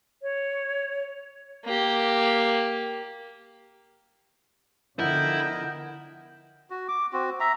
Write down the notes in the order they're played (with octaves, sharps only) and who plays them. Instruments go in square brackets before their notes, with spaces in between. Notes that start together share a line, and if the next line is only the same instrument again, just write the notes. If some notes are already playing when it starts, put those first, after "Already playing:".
[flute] C#5
[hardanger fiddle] A#3 G4
[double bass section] D3 F3 [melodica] B3 A#4 D#5 [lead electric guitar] E4 [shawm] G5
[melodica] F#4
D6
C4 F#4
E5 A#5